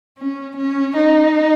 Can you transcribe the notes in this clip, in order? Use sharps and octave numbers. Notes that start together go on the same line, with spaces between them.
C#4
C#4
D#4